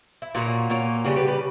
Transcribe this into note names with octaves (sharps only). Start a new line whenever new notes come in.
E4
A#2 A#3 C#4 F#4
A#2 A#3 C#4
C#3 G3 C#4 F#4
G4 B4
B4 D5